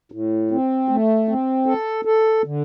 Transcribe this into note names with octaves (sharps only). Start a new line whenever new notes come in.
A2
C4
A3
C4
A4
A4
D3